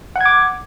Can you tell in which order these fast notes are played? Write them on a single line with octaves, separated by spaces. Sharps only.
F#5 G#6 D6